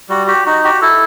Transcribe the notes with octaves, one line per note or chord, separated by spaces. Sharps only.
G3 F#4
F#4 G4
D#4 F#4
F#4 G4
E4 A4